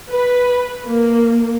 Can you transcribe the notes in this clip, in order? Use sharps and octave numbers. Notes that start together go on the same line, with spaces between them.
B4
A#3